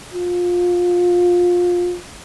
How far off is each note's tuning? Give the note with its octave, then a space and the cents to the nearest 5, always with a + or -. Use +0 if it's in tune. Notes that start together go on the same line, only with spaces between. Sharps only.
F4 +20